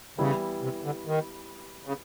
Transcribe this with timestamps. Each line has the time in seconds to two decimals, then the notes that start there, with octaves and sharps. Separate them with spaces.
0.18 C#3 E3 G3 B3 E4
0.62 C3
0.84 D3
1.06 D#3
1.86 C#3